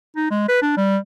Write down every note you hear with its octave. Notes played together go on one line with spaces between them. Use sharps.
D#4
G#3
B4
D4
G3